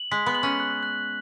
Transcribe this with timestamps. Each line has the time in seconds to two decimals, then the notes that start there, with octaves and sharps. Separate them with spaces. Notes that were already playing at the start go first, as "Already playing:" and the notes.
Already playing: F#7
0.11 G#3 B6
0.26 B3
0.35 F#7
0.43 C#4
0.60 F#6
0.83 F#6